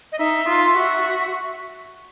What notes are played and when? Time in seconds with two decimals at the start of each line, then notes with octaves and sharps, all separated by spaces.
0.12 D#5
0.19 D#4 E5
0.49 F4
0.77 F#4